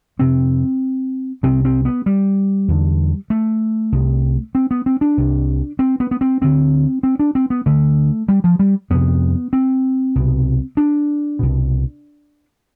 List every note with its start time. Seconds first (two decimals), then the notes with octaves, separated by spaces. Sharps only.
0.19 F2 C3 C4
1.43 C2 C3 C4
1.65 C4
1.85 B3
2.06 G3
2.68 E2 D3
3.30 A3
3.92 C2 C3
4.55 C4
4.71 B3
4.86 C4
5.01 D4
5.17 C2 C3
5.79 C4
6.00 B3
6.11 B3
6.21 C4
6.41 D2 D3 C4
7.03 C4
7.19 D4
7.35 C4
7.50 B3
7.66 D2 D3 A3
8.28 G3
8.44 F3
8.59 G3
8.90 F2 C3 B3
9.53 C4
10.15 C2 B2
10.77 D4
11.39 C2 B2